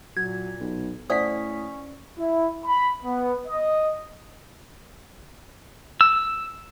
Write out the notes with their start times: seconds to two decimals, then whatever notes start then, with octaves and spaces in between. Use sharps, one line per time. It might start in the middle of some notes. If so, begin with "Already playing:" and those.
0.17 A#2 F#3 G#6
0.60 B1
1.10 A2 C#4 C5 D5 F#5 D#6 B6
2.19 E4
2.65 B5
3.03 B3
3.47 D#5
6.01 E6